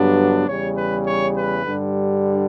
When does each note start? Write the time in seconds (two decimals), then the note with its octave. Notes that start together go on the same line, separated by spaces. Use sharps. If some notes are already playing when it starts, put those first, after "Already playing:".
Already playing: G2 D3 F#3 B3 D4
0.48 E2 C#3 G3 C#5
0.77 B4
1.06 C#5
1.36 B4
1.65 G2 D3 G3